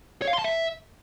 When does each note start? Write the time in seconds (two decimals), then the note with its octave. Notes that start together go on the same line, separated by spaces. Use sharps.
0.22 C#5
0.28 F5
0.33 C6
0.39 A5
0.44 E5